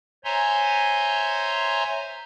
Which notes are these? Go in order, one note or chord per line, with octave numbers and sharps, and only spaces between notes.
C5 C#5 E5 G#5 A#5 C6